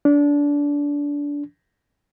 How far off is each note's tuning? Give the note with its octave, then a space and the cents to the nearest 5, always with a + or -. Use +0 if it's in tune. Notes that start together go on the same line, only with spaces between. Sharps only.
D4 -25